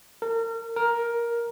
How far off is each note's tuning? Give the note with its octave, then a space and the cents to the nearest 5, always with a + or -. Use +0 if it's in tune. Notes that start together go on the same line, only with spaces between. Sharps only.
A#4 -35
A#4 +10